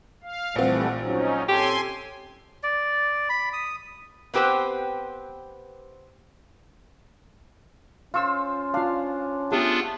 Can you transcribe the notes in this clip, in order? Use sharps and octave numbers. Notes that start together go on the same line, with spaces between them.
F5
A#1 E3 G3 A3 C4 F5 F#5
G#2 F3 F#3 C#4 D#4
C#4 G4 A4 G#5 C6
D5
B5
D#6
B3 C4 G4 B4 C5
C#4 F4 C5 F5 C#6 E6
D4 F4 F5
A3 B3 D4 F4 G4 G#4